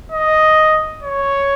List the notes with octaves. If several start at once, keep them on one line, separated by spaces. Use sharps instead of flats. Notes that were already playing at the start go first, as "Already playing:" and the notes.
D#5
C#5